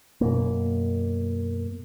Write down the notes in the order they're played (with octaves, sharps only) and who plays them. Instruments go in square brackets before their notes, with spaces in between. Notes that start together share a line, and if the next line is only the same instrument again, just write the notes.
[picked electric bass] F#2 B2 A#3